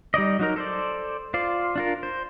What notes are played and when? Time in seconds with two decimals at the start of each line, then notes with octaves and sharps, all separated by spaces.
0.14 G3 D#4 D5 D#5
0.39 F#3 D#4 A#4
0.56 A4 C5 D5
1.34 F4 C5 D5
1.76 D4 F4 A#4
2.03 C5